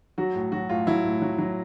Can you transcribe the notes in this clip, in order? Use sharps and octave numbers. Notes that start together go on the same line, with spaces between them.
F#3 F#4
A2
F#3 F#4
A2 F4
F#3 E4
A2
F#3
F#3